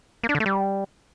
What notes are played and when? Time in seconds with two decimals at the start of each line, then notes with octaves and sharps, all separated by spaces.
0.24 A#3
0.29 D4
0.35 D3
0.40 A3
0.46 G3